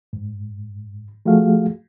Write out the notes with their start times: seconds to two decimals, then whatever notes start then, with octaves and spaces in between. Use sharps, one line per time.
0.13 G#2
1.26 F3 A3 F#4 G#4 F5